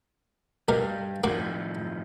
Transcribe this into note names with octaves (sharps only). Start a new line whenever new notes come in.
G2 B2 G3 A#3 A#4
A2 D#3 F3 A#3 F#4 D6